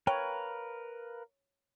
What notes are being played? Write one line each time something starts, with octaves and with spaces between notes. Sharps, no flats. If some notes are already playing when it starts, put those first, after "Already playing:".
A#4 B4 C#5 F5 G5